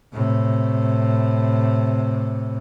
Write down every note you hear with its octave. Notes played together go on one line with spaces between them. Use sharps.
A2 C3